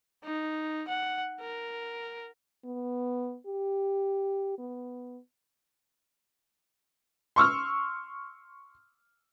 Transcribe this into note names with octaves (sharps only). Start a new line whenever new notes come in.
D#4
F#5
A#4
B3
G4
B3
C6 C#6 E6 F6